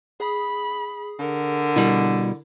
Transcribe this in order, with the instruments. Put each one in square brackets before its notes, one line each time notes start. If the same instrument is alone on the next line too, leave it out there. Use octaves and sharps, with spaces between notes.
[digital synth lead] G#4 [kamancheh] B5
[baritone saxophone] D3 [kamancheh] A#4
[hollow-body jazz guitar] B2 G3 [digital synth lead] E4